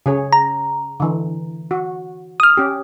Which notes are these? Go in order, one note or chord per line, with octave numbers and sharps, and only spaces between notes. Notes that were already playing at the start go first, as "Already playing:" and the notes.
C#3 G#4 C#5
A#5
D3 E3
F#4
D#6 F6
C#4 G4